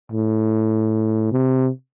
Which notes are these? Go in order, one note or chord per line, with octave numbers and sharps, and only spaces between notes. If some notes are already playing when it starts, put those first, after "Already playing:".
A2
C3